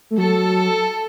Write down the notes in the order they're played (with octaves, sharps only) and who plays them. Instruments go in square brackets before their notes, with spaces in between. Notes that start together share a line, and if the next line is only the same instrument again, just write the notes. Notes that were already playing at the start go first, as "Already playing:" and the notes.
[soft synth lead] A3
[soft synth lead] F#3 [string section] A4